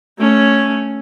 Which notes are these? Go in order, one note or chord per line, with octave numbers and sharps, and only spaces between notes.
A3 C#4